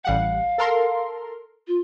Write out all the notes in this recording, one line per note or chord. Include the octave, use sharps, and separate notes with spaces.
A1 G3 F5 F#5
A4 A#4 C6
F4